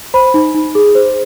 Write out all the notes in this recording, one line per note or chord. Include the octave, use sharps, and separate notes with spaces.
C5 B5
D#4
D#4
G#4
C5